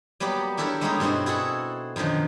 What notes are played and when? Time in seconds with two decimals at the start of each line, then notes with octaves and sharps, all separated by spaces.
0.20 F#3 G3 A#3 B3 G4 D5
0.57 D4 E4 G4 A4 A#4 C#5
0.81 G3 G#3 A#3 B3 C#4 D#4
1.00 G2 B2 C4 E4 F#4
1.26 E4 F#4 G#4 A4 F#5
1.96 F#2 B2 D3 D#3 F3